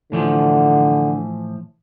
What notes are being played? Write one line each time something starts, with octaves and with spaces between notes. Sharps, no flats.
A2 D3 E3 F3